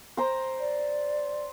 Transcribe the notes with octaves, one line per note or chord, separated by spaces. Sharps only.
C5 G5 A#5
D5